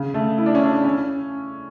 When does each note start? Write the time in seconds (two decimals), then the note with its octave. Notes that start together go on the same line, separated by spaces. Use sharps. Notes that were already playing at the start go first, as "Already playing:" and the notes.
Already playing: C#3
0.14 A3
0.38 E4
0.46 D4
0.55 C#4
0.64 D4
0.84 C#4